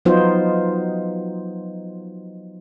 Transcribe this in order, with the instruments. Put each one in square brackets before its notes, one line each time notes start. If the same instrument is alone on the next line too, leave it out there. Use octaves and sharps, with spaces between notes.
[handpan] F3 F#3 B3 D#4 F4 C5